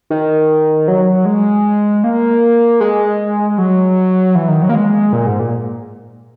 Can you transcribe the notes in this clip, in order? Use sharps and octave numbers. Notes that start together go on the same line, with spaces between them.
D#3
F#3
G#3
A#3
G#3
F#3
E3
D#3
F#3
A#3
G#3
A#2
G#2
A#2